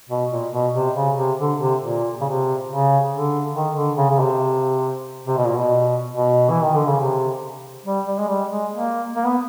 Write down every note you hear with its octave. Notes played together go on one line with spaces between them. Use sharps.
B2
A#2
B2
C3
C#3
C3
D3
C3
A#2
C#3
C3
C#3
D3
D#3
D3
C#3
C#3
C3
C3
B2
A#2
B2
B2
E3
D#3
D3
C#3
C3
G3
G3
G#3
G3
G#3
A#3
A#3
B3